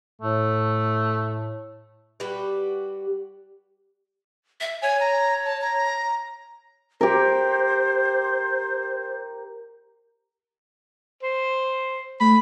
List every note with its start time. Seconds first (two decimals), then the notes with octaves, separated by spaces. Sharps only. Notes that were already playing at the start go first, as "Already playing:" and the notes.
0.22 A2 A3
2.20 G3 F#4 G4 B4
4.61 E5
4.82 C#5 G#5
5.00 A#5
5.46 A5
5.61 A#5
7.01 G4 A#4 C5
11.22 C5
12.20 A3 B5